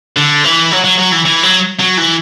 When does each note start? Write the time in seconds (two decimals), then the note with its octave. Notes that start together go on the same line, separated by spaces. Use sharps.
0.17 D3
0.44 E3
0.71 F#3
0.84 F#3
0.98 F#3
1.12 E3
1.25 E3
1.43 F#3
1.79 F#3
1.97 E3